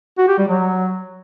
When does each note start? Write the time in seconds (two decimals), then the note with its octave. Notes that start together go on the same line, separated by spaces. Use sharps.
0.18 F#4
0.28 G4
0.38 G3
0.48 F#3